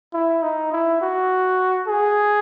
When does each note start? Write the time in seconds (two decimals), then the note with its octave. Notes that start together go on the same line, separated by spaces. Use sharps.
0.13 E4
0.42 D#4
0.72 E4
1.01 F#4
1.87 G#4